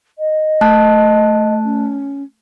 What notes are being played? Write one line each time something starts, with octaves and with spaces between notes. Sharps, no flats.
D#5
A3 A5 F#6
C#4